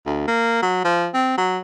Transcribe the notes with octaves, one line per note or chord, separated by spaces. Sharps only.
D2
A#3
F#3
F3
C4
F#3